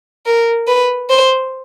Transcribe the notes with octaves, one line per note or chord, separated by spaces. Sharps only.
A#4
B4
C5